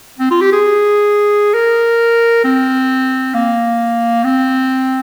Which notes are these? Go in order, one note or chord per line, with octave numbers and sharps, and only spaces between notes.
C4
F4
G4
G#4
A#4
C4
A#3
C4